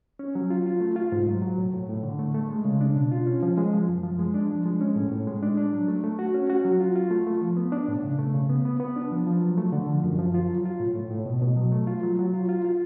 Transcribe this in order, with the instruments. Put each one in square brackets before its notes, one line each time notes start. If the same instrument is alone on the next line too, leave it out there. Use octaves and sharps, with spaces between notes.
[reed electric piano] C#4
F#3
F4
F4
A3
F4
G#2
F#3
F#3
A2
A2
A2
D3
A3
A3
G#3
C#3
D4
B2
F4
C#4
F3
G#3
F3
F#2
F3
G#3
D4
F3
G#3
C#4
A2
A2
G#3
D4
D4
F#3
A3
A3
F#4
C#4
F#4
F#3
F4
F4
A3
A3
F3
B3
D4
A2
C#3
A3
C#3
B3
B3
B3
D4
F3
F3
F#3
A3
D3
F3
F#2
F3
F4
F#3
F4
A2
A2
A2
B2
B2
F#3
A3
F4
F#3
F#3
F4
F4
F4